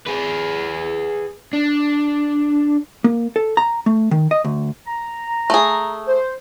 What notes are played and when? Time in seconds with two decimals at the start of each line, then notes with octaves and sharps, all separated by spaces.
0.07 G#4 B4
1.53 D4
3.04 A#3
3.36 A4
3.57 A#5
3.86 A3
4.11 D#3
4.31 D#5
4.45 D2
4.87 A#5
5.50 A3 G#4
6.08 C5